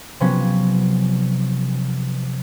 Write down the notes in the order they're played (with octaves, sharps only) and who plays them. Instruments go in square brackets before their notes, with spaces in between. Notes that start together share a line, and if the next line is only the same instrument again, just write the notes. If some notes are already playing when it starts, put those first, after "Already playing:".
[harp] C3 F3 F#3 B3 C#4